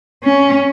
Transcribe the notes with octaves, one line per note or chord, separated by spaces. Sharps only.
C#4